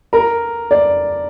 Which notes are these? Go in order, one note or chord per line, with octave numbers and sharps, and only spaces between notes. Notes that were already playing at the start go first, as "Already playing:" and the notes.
A#4
D5